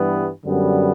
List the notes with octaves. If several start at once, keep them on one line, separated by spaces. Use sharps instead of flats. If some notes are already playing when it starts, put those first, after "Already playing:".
Already playing: G2 E3 G3 B3
F#2 D3 G3 B3